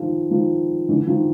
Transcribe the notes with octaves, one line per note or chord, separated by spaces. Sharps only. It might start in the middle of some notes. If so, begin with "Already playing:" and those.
Already playing: D#3 F3
D#3 F3
D3 E3
D#3 F3